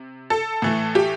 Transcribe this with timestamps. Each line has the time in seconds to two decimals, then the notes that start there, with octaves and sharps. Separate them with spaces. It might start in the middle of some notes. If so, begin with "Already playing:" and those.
Already playing: C3
0.30 A4
0.62 A2 E3 A3
0.95 G4